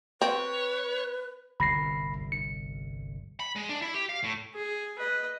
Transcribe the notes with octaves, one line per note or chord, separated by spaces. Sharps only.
C4 B4 C#5
G1 C2 B5 A#6 C7
C#7
B5
G#3
D4
E4
G4
F5
A2
G#4
B4 D#5